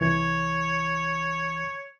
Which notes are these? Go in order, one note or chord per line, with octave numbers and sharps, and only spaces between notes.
C2 E3 C#5 G#6